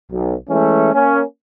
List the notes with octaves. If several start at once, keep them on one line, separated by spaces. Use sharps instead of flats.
B1
E3 G#3 A3 C#4
A#3 C#4